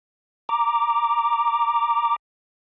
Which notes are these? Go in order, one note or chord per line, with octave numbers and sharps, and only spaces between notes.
A#5 D6